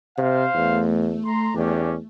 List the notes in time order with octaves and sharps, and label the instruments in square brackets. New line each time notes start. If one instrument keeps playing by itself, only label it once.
[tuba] C3 [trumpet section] C5 F5
[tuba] E2 [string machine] A3
[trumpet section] A#5 C6
[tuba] E2 [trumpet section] C#4 D4 G4